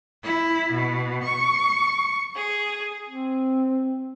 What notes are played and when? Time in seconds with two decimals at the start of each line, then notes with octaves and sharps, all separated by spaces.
0.23 E4
0.72 B2
1.25 C#6
2.36 G#4
3.09 C4